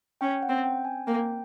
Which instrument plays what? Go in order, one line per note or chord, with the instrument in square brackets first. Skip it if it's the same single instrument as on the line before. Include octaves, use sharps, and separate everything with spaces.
[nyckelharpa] C#4 [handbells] G5
[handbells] F#5
[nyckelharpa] C4
[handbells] G5
G#5
[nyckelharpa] A#3 [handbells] G5